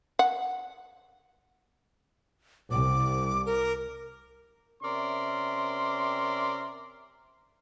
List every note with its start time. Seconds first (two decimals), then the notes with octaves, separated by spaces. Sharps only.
0.19 F#5
2.71 C2 D6
3.46 A#4
4.83 C3 C#4 A#4 D5 E5 C6